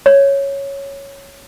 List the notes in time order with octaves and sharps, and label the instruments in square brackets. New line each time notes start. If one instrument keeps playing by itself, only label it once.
[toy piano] C#5